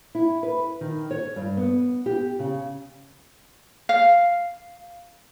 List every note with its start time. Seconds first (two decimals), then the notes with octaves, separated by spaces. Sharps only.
0.15 E4
0.43 B4
0.81 D#3
1.11 C#5
1.36 G2
1.57 B3
2.06 G4
2.39 C#3
3.89 F5